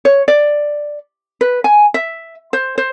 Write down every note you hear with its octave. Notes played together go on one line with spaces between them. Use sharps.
C#5
D5
B4
G#5
E5
C5
C5